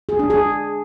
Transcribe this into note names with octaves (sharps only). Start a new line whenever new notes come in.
G#4
D4
G#4